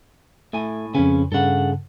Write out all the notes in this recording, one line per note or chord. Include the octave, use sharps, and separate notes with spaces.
A2 A3 G#5
F2 C#3 C#4 B4 G#5
G2 C#3 A4 F#5